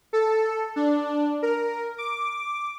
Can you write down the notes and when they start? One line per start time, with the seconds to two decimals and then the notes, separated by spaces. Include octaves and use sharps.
0.13 A4
0.76 D4
1.42 A#4
1.98 D6